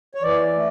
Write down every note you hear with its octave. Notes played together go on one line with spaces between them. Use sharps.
C#5
E3 D5
A3